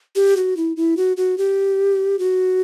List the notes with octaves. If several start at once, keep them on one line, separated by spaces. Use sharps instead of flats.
G4
F#4
E4
E4
F#4
F#4
G4
F#4